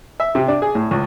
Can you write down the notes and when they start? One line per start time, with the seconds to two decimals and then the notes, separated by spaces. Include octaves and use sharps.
0.20 E5
0.35 C3
0.48 D4
0.62 G#4
0.75 A2
0.91 C#2